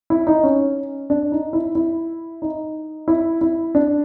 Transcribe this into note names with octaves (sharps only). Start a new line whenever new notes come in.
E4
D#4
C#4
D4
D#4
E4
E4
D#4
E4
E4
D4